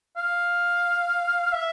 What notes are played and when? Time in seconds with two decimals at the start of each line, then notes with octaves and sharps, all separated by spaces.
0.17 F5
1.53 E5